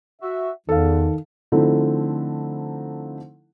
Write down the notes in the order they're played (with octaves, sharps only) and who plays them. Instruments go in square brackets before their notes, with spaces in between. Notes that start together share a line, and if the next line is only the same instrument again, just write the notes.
[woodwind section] F#4 E5
[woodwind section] E2 [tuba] D#3 [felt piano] A4 F5
[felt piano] D3 F3 A3 C4 D#4 E4